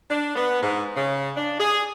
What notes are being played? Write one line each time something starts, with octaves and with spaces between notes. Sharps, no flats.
D4
B3
G#2
C#3
D4
G#4